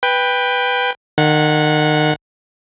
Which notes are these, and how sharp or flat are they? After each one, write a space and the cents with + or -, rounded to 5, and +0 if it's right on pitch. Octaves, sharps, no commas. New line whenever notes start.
B4 +0 G5 +15
D#3 -30 F#5 -20